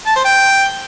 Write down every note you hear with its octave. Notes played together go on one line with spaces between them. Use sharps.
A5
C5
G5